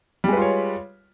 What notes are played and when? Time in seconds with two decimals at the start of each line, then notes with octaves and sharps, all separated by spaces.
0.24 G3
0.28 G#3
0.33 B4
0.37 F4
0.42 C#5